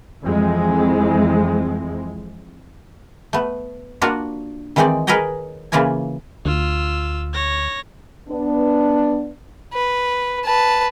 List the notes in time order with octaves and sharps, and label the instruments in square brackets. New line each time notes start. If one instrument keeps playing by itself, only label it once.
[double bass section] F2 E3 G#3 C4
[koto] A3 B3
A#3 D4 F4 F#4
D#3 E3 G#3 C4 D#4 D5
G#4 A#4 B4 C#5 D#5 G5
C#3 E3 A#3 F4 A#4 G#5
[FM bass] D2 [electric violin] F4 E6
[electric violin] C#5 A#6
[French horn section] B3 D4
[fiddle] B4
B4 A5